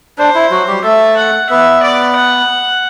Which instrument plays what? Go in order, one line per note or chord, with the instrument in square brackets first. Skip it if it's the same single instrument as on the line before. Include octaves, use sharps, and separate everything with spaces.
[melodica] D4 [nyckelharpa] C5
[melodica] E4
F#3 F#4
G3 G4
[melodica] A3 A4 [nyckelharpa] E5
[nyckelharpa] F#5
[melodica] B3 B4 [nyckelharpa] E5
[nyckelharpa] D5
F#5